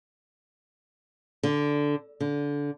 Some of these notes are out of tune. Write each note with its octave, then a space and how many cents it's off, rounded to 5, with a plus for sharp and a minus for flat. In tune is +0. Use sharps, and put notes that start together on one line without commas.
D3 -5
D3 -20